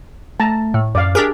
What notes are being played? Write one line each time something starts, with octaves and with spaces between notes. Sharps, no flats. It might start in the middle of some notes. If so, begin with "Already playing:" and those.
A3 A5 A#5
A2
F#2 D5 F5
D4 G4 G#4 A#4